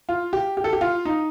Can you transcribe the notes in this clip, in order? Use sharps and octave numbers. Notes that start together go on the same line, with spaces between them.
F4
G4
G4
A4
G4
F4
D#4